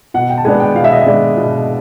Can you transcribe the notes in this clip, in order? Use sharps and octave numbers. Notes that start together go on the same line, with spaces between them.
B2 F#5
G5
A5
G#3 B3 D4 G#5
G5
B2 F5
E5
D#5
E5
G#3 B3 D4
B2